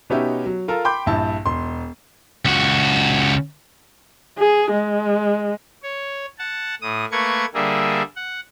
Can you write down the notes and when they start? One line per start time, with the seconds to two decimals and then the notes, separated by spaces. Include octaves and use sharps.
0.10 B2 B3 C#4 D#4 G4 E5
0.46 F#3
0.68 F4 A4 A#4
0.85 G5 B5 C6 D6 G6
1.06 A#1 G2 E4 A5 E6
1.46 E1 C6
2.45 C#2 F#4
4.39 G#4
4.71 G#3
5.83 C#5
6.39 F#5 A5
6.81 A2 D#6
7.11 A3 A#3 B4 C#6 G#6
7.54 D3 G3 A#3 G#4 E5
8.16 F#5